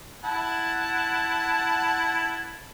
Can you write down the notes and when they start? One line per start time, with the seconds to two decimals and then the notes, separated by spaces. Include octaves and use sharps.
0.24 E4 F#5 A5